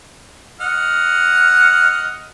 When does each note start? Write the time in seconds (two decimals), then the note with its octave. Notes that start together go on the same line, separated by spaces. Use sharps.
0.61 D#5 F#5 F6